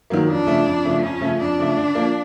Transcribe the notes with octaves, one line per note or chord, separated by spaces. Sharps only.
D#3 F#3 A#3
F2 D4
C#3 F3 A3
F2
C#3 F3 A3
F2 C#4
C#3 F3 A3
F2 D4
C#3 F3 A3
D3
F3 A#3